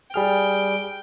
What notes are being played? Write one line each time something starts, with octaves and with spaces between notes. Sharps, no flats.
G3 G#4 G5 F6